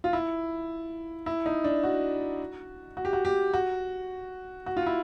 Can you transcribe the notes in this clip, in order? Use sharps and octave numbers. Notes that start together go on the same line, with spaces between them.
F4
E4
E4
D#4
D4
F#4
F#4
G4
F#4
G4
F#4
F#4
F4
E4